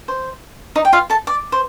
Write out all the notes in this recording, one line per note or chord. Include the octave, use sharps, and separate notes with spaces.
C5
D#4 D#5
G5
F4 F5
A4 A5
D5
C5